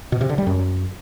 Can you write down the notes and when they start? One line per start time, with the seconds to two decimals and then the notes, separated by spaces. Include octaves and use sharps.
0.12 B2
0.21 C3
0.29 D3
0.38 G3
0.47 F#2